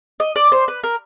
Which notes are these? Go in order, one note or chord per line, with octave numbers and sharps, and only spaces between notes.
D#5
D5
C5
B4
A#4